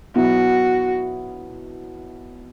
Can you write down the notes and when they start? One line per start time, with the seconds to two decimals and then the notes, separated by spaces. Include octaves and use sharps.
0.15 B2 F#3 B3 E4 F#4